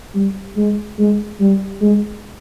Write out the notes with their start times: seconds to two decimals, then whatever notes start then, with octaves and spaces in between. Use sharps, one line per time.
0.15 G3
0.56 G#3
0.98 G#3
1.40 G3
1.81 G#3